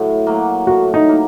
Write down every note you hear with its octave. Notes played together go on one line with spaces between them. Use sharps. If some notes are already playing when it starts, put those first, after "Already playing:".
Already playing: A2 F#3
F#3 A#3
A2 F#4
D#4
F#3 A#3